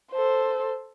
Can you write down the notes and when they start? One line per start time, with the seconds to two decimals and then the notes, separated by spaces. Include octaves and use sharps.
0.13 A4 C5